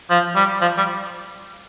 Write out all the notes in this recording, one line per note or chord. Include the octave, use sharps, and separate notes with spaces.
F3
G3
F3
G3